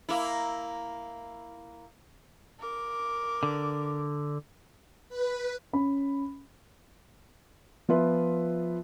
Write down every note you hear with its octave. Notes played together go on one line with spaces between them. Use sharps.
A#3 E4
A#4 D6
D3
B4
C#4 B5
F3 B3 F4 B4 E5